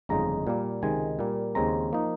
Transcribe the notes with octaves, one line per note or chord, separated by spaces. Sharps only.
G1 F2 C#3 G#3 D#4 A#5
A#2 G3 A#3
C#2 C3 D#3 G#3 G#5
A#2 G3 A#3
D#2 C#3 G#3 C4 A#5
F3 A#3 D#4